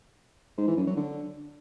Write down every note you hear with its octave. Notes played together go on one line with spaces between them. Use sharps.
G#2
E3
F#2
F#3
D3